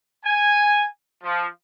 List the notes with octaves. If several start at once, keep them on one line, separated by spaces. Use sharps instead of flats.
G#5
F3